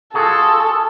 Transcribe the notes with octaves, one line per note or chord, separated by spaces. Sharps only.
F4 F#4 G#4 A4